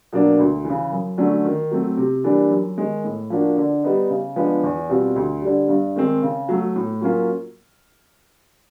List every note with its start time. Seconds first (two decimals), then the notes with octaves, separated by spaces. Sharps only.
0.13 B2 F#3 A#3 D4
0.39 D2
0.65 C#3 E3
0.91 F#2
1.18 D3 F#3 A3 C#4
1.45 D#3
1.71 F#3 A3 C4
1.97 C3
2.24 E3 G3 A#3 D4
2.51 F#2
2.78 D#3 G#3
3.04 A2
3.30 F3 A#3 D4 F#4
3.57 D3
3.84 G3 B3 D#4
4.10 C#3
4.36 F3 G#3 B3 D4
4.63 E2
4.89 B2 G3 C4 F4
5.16 D2
5.42 D3 G3
5.68 G2
5.96 D#3 G#3 C4
6.22 C#3
6.49 F#3 A3
6.76 A2
7.01 F#3 A#3 C#4 F4